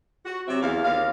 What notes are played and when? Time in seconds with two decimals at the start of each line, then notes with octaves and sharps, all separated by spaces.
0.25 F#4
0.47 C3 F#3 C4 E5
0.61 E2 F5
0.84 D#2 F5